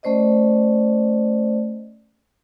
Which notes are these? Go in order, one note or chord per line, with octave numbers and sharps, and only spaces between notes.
A3 C#4 C5 D5 D#5